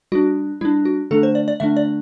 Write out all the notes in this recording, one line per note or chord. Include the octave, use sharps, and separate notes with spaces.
G3 D4 F#4
G3 D4 E4
F#4
D3 A3 D4 A4
C5
D5
D5
D3 A3 D4 E5
D5